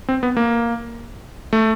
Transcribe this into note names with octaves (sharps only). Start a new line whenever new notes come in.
C4
B3
A#3
A3